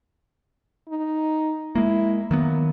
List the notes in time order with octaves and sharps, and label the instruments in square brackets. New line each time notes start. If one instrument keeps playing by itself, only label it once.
[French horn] D#4
[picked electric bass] G#3 A#3 [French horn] E4
[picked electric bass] D#3 F#3 B3 [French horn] A#3